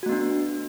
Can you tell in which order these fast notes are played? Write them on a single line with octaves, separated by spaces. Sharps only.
F#4 A3 B3 D4